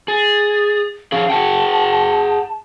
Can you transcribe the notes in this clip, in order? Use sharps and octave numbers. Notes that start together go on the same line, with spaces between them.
G#4 A6
F3 C#4 G#4 F5
G#4 F#5 G5 A5